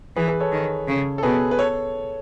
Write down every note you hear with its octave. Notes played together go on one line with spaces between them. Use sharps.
E3 G#4 B4
G#4 B4
A4 C#5
D#3
C#3
A4
B2 G#4 B4
B4
A4 C#5